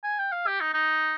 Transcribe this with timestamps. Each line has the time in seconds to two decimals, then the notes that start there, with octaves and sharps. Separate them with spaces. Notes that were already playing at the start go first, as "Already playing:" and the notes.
0.04 G#5
0.19 G5
0.32 F5
0.47 G4
0.61 D#4
0.74 D#4